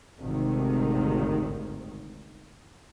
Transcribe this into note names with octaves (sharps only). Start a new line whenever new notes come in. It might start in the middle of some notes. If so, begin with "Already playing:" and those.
G#1 D2 C3 D#3